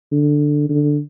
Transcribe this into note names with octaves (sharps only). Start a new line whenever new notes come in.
D3
D3